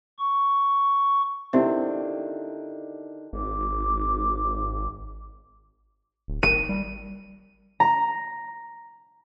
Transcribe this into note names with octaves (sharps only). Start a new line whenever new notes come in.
C#6
D3 D#3 C4 E4 G4 E5
G#1 D6
D1
G#1 D#7
G3
A#5